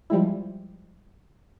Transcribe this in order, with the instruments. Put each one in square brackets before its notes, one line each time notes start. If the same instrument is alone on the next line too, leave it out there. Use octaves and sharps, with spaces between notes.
[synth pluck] F3 G3 G#3 E4